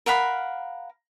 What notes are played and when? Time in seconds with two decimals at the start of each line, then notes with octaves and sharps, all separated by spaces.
0.06 A#4 F5 F#5 B5